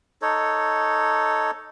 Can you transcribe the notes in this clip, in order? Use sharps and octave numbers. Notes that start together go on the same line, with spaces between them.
D#4 A4 C#5